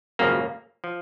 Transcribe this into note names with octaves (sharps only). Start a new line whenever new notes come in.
G#1 F#2 C#3 F3 A#3
F3